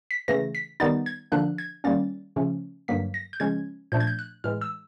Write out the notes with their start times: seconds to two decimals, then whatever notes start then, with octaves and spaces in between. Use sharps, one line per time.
0.11 B6
0.28 C#3 E3 A3 A#6
0.55 B6
0.80 D#3 G3 B3 D#4 A6
1.06 G#6
1.32 D3 F3 A#3 D4 F#6
1.58 G#6
1.84 D#3 G3 A#3 C#4 A6
2.36 C#3 F3 A3 C#4
2.88 G2 D3 F#3 A#3 B6
3.14 A#6
3.33 G6
3.40 C#3 F3 G#3 C#4 G#6
3.92 A#2 F3 A3 D4 G6
4.00 G#6
4.07 G6
4.19 F#6
4.44 A2 E3 G#3 F6
4.61 E6